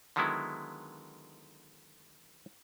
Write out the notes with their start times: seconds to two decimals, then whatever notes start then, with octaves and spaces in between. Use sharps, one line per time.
0.16 D3 D#3 F#3 G#3 B3 E4